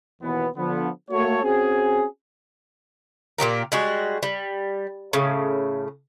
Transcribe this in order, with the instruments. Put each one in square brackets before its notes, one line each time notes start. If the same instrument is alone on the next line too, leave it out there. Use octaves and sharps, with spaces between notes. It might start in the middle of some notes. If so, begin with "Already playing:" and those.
[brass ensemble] D#2 B2 E3 B3
D3 F3 B3
A3 A#3 F#4 A4 C#5
C4 C#4 F#4 G#4
[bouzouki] A#2 F#3 G4 A#4
G3 G#3 F#4
G3
A2 C#3